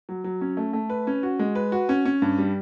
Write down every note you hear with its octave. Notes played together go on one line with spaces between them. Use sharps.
F#3
F#3
C#4
A3
A3
B4
C#4
F#4
G#3
B4
F#4
C#4
C#4
G2
G3